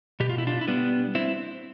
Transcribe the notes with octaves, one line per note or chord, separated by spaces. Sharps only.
B2 G4
F4
E4
D4 F4
E4
G3 B3 D4
C4 E4